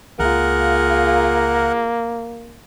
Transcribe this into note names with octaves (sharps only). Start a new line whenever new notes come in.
C#2 A#3 F4 G#4 A#4 F#5